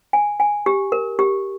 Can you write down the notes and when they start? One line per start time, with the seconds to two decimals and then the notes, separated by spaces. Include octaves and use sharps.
0.13 G#5
0.40 G#5
0.66 G4
0.92 A#4
1.19 G4